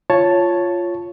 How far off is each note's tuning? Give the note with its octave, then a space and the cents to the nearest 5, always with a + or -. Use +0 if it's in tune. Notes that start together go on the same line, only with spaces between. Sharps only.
F4 -5 C#5 +0 A5 +0